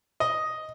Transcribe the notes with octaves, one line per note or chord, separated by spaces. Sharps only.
D#5